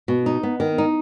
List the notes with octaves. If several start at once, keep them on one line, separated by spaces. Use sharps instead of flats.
B2
D#4
B3
D#3
D#4